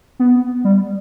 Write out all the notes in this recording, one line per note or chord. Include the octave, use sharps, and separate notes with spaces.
B3
G3